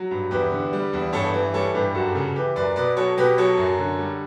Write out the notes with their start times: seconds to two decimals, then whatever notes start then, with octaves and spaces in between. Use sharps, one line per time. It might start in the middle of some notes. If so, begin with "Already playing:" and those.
Already playing: F#3
0.11 G2
0.31 E2 G4 B4
0.52 D3
0.73 G3
0.93 E2
1.13 G2 A4 C#5
1.34 E3
1.54 G3 A4 C#5
1.74 G2 G4 B4
1.94 F#2 F#4 A4
2.09 G4
2.15 C#3 F#4 A4
2.36 E3 G4 B4
2.56 F#2 B4 D5
2.76 B2 B4 D5
2.96 F#3 A4 C#5
3.17 B2 G4 B4
3.38 F#3 A4 C#5
3.58 F#2
3.79 D3
3.98 G3